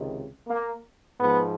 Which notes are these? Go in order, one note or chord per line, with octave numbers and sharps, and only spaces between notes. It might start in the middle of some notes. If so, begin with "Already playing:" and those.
Already playing: C#2 C3 D#3
A#3
G#2 F3 B3